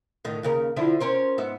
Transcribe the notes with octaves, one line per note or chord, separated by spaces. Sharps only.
A2 D3 D#3
D#2 C#3 A#4
D3 F3 E4
C#4 A#4 C5
G#2 B3 E5